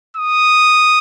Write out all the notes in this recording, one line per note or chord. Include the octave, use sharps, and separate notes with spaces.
D#6